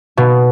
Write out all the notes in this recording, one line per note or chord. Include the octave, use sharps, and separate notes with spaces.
B2